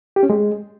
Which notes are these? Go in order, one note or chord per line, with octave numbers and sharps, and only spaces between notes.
G4
C#4
G#3